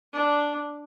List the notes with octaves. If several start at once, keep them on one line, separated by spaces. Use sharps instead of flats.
D4